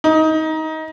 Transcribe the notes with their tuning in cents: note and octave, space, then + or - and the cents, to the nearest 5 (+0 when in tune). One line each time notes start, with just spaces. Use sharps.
D#4 +20